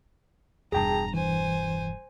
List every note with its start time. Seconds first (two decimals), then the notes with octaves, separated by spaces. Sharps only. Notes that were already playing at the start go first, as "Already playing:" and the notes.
0.72 E1 G2 G#4 G5 A5 A#5
1.14 E3 C5 G#5